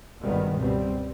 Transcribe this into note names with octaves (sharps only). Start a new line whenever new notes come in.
G#1 G2 D#3 G3 B3
C#2 B2 G3 C4